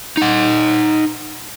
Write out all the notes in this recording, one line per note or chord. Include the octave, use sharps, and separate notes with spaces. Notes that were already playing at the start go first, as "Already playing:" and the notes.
D#4 F#5